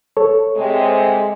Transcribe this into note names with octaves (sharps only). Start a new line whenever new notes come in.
A4 C#5
C3 G#3